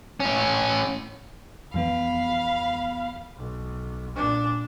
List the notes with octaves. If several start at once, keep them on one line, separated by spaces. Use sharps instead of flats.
A2 C#4
F2 E3 B3 F5 B5
B1
A#2 D4